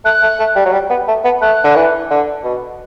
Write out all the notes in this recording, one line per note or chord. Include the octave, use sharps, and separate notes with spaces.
A3 F#6
A3
A3
G3
F#3
G3
B3
A3
B3
A3 F#6
D3
E3
D3
B2